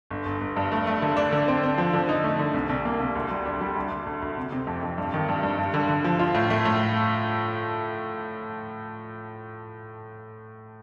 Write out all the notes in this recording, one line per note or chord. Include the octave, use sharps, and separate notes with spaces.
G1
G1
G1
G2
A3
A3
D3
D4
D3
C4
C4
F3
D3
D#4
A3
D3
C2
C2
A#3
C2
D2
G3
D4
G3
D2
D2
D2
D2
C3
C3
F2
F2
G2
D#3
G2
G2
G2
D3
D3
F3
F4
A2
A3
A2